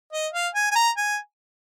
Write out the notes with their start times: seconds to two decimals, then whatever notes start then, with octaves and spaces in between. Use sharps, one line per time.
0.13 D#5
0.33 F5
0.54 G#5
0.71 G#5
0.75 A#5
0.97 G#5